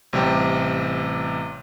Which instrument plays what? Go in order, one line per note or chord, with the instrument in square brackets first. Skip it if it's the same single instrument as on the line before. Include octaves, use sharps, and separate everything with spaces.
[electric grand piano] A1 C3 G3 G4